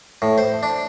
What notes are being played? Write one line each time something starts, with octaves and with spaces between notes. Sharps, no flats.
A2
C5
D4